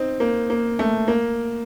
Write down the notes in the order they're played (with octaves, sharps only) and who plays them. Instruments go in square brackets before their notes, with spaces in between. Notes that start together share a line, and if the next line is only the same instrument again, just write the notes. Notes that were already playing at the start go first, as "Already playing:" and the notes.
Already playing: [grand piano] C4 D#4
A#3
A#3
A3
A#3